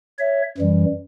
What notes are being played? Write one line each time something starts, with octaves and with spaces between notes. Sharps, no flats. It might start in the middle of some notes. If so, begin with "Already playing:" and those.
C#5 E5
F#2 E3 G3